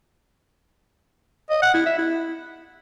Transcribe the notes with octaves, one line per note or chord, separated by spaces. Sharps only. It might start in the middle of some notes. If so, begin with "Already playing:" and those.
D#5
F#5
E4
E5
E4